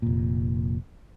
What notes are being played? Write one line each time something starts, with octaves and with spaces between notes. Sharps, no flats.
F1 A#2